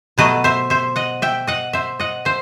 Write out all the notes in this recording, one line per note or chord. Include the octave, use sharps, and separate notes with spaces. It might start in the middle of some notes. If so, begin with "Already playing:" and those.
B2 F#3 A3 B4 D#5
C5 E5
C5 E5
D#5 F#5
E5 G5
D#5 F#5
C5 E5
D#5 F#5
C5 E5